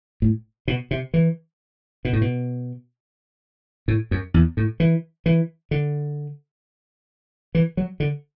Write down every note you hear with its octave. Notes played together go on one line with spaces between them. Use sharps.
A2
B2
C3
E3
B2
A2
B2
A2
F#2
E2
A2
E3
E3
D3
E3
F#3
D3